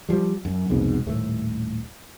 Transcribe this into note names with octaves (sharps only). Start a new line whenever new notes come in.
F3 G3
F#2
C2 F2 G#2 B2
D#1 A2 A3